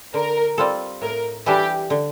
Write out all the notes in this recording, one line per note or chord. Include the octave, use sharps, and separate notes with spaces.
D3 A#4
G3 C4 F4 A4
A2 A#4
E3 G3 D4 G4 A4
D3